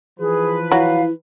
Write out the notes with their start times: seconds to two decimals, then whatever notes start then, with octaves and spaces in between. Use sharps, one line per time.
0.20 E3 F3 G#4 B4
0.72 F#3 E4 F5